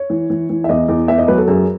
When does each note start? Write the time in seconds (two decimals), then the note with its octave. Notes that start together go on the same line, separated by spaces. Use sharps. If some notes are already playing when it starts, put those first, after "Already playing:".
Already playing: C#5
0.10 E3
0.30 E3
0.50 E3
0.64 E5
0.69 E2 D#5
0.89 E2
1.08 B3 E5
1.18 D#5
1.28 F#3 B4
1.38 A4
1.48 F#2 G#4